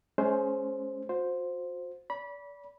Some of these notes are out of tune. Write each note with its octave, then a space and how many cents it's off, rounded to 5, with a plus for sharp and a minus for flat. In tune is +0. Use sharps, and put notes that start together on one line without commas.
G#3 +35 C#4 +0 C5 +0
F#4 -45 C5 +0
D5 -35 B5 -20